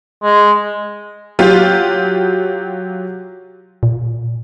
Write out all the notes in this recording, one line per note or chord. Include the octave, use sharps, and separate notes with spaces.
G#3
F#3 F4 G4
A#2